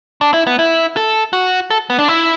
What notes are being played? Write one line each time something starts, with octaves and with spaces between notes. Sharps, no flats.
D4
E4
B3
E4
A4
F#4
A4
B3
D4
E4